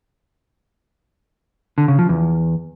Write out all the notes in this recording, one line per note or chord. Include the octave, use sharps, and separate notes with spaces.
D3
C#3
F3
E2